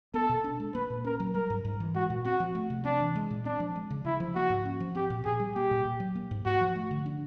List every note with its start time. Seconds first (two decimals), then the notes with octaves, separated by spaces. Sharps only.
0.14 B3 A4
0.29 B2
0.44 D4
0.60 G#3
0.75 A#3 B4
0.90 A#2
1.04 C#4 A#4
1.20 F#3
1.34 G3 A#4
1.50 G#2
1.65 G#2
1.80 E3
1.95 G#3 F#4
2.10 A#2
2.25 C4 F#4
2.40 F3
2.55 A3
2.70 C3
2.85 C4 D4
3.00 E3
3.15 G#3
3.31 A#2
3.45 C4 D4
3.60 F3
3.76 G#3
3.90 C#3
4.05 C#3 E4
4.20 F3
4.35 A#3 F#4
4.50 G#2
4.65 C#4
4.80 F3
4.95 C4 G4
5.10 A#2
5.25 A#2 G#4
5.40 G3
5.55 A#3 G4
5.71 A#2
5.85 A#2
6.00 F#3
6.15 A#3
6.31 G#2
6.46 G#2 F#4
6.61 F3
6.76 A3
6.91 D3
7.06 D4